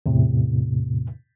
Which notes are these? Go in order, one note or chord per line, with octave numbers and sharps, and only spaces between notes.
E2 A2 C3